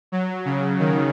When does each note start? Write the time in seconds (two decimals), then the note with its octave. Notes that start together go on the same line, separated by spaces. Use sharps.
0.12 F#3
0.45 C#3
0.79 D#3